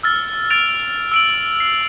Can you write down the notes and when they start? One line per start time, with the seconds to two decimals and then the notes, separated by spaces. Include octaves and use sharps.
0.03 E6 F6 A6
0.50 F6 A6 D7 F7
1.12 E6 D7 F#7
1.60 C7